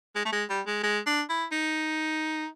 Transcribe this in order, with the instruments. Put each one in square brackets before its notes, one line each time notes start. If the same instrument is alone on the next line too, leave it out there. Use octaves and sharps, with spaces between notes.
[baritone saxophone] G#3
A3
G#3
G3
G#3
G#3
D4
E4
D#4